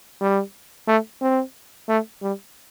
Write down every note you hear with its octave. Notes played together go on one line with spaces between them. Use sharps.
G3
A3
C4
A3
G3